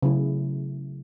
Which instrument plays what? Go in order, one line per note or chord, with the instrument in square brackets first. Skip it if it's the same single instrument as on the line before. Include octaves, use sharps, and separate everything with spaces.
[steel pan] C#3 F#3 A3 E4 G#4